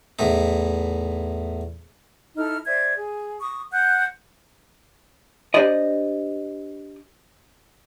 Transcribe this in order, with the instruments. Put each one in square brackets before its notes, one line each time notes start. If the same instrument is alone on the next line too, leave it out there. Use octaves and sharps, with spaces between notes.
[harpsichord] E2 A2 D#4
[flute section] D#4 E4 A4 F6
C5 D5 E5 G#6
G#4
C#6 D#6
F#5 F#6 G6
[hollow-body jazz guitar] D4 G4 C5 D5 D#5